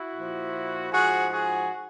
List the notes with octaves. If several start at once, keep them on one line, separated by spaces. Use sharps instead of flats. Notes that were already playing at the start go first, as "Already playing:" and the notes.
Already playing: E4 F#4
A#2 F3
G#2 F3 F#4 G#4
F#4 G#4